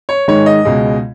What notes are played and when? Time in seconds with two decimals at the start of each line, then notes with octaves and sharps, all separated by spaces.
0.09 C#5
0.28 G#2 D#3 G#3 C#5
0.46 D#5
0.65 C#2 B2 G#3